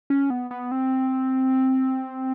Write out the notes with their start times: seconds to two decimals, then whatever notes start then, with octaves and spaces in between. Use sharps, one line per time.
0.10 C#4
0.30 B3
0.51 B3
0.72 C4